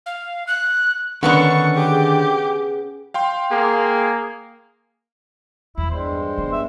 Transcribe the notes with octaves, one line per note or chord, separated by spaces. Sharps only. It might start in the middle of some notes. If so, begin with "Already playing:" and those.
F5
F#6
D3 D#3 C#4 D4 B4 F#5 C#6
G4 G#4
F5 G5 C6
A#3 G#4
E2 E4
G2 G3 G#3 C5
B3
E5